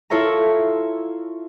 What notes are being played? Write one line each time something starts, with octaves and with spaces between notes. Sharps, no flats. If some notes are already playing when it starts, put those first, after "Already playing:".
E4 F4 A4 C#5 E5 A#5